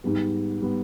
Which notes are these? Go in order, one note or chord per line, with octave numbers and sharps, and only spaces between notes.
G#2 G3 B3
G3 B3